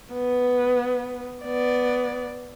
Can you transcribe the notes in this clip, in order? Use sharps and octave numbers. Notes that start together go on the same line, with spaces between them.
B3 B4
B3 D5